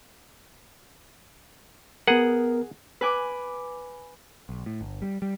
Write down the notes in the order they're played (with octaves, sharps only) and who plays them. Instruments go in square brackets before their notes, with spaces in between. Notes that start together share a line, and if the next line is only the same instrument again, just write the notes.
[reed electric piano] B3 A#4 [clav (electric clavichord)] G#4 F#5
[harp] B4 G#5 D6
[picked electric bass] B1
A2
G1
G3
G3